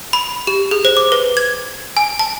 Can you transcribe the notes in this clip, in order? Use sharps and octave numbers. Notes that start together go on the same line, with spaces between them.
B5
G4
G#4
C5
D6
B4
G#6
G#5
A5